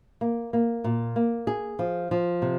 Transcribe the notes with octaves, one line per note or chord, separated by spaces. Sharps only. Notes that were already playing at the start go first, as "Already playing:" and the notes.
A#3
A#3
A#2
A#3
G#4
F3
F3
C3